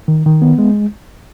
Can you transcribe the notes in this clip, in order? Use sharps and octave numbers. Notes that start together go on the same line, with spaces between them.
D#3
D#3
B3
G#3